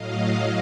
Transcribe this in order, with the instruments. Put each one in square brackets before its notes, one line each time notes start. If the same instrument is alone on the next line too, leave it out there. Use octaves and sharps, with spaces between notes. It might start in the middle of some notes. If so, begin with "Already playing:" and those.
Already playing: [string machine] A2 F#3 D#5 F5